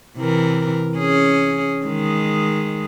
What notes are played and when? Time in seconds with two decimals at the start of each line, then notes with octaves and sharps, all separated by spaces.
0.17 C3 E3 A#4
0.98 C#4 G#4
1.86 D#3 G#3